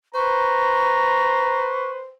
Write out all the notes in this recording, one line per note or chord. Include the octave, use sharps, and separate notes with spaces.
B4 C5 A#5 C#6